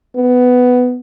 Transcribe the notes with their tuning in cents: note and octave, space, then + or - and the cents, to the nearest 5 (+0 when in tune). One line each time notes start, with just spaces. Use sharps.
B3 +10